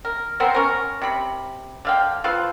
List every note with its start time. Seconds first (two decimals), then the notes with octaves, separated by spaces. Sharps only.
0.05 A#4
0.40 B3 C4 A#4 C5
0.55 C#4 A#4
1.02 C3 B5
1.85 D3 F5 G5
2.24 F4 A4 B4 C5